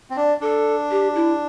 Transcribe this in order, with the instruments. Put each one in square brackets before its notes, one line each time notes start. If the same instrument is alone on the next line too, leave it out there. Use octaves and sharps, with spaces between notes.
[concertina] C4
[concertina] D4 [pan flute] D5
[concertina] D4 [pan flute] A4
[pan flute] G4
E4